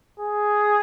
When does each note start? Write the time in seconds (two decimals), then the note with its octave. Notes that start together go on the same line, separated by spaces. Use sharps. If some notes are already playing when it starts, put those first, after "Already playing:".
0.20 G#4